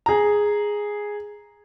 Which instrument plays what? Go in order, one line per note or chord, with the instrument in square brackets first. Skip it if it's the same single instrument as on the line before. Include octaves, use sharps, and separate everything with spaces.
[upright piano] G#4 A#5